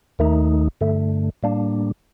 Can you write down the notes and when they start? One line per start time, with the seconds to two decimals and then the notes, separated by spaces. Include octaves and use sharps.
0.19 D#2 D#3 A3 D#4
0.81 G2 D3 A3
1.43 A2 G3 A#3 D4